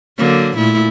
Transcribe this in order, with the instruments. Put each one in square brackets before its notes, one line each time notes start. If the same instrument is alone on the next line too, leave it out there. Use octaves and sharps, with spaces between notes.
[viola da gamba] D3 F#3 A#3
A#2 A3 E4